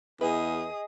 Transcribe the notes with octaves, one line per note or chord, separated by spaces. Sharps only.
E2 G#4 B4 D#5 D#6